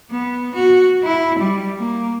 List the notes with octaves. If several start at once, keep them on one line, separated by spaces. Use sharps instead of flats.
B3
F#4
E4
G3
A#3